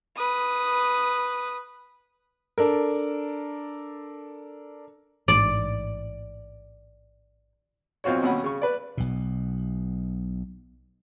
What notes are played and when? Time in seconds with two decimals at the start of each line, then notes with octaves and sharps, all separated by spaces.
0.17 B4 D#6
2.58 D4 A4 A#4
5.28 A1 G#2 D5
8.04 B1 C4 F4 F#4 C#5
8.22 D#2 B2 C#4 F#5 B5
8.44 C#3 C#6
8.62 B4 D5
8.97 B1 B2